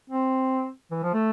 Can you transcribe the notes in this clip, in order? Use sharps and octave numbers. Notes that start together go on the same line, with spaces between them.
C4
E3
F3
A3